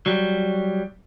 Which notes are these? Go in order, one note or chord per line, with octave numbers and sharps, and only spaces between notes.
F#3 G3